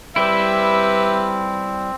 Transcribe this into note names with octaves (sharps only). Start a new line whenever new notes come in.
G3 C4 E4 G4 B4 E5